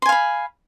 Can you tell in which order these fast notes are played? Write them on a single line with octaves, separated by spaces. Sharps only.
C6 G#5 F5 B5